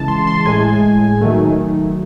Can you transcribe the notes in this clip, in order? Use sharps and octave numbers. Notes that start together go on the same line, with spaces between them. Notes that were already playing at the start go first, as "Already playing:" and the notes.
Already playing: C#3 E3 G#3 A5
C6
C6
A2 G#3 G#5
D#3 F#3 A3